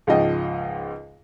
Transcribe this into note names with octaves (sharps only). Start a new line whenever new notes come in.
C#2 G#2 F3 D#5 G5